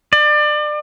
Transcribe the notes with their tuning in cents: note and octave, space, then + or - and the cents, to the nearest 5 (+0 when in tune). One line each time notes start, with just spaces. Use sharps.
D5 +30